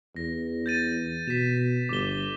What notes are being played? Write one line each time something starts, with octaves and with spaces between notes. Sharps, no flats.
E2 A#6
G6 A6 D#7
B2 B6 E7
G1 D6 G7